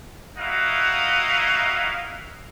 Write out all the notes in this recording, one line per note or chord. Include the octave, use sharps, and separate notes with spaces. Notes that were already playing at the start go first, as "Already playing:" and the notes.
D#4 E4 F#4 D#5 F5 F#5